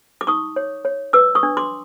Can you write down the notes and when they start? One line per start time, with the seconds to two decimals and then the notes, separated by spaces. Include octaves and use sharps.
0.21 D6
0.27 D#4 C#6 D#6
0.56 C#5
0.85 C#5
1.13 B4 D6 E6
1.35 C#6 D#6
1.43 D4
1.57 C6 D6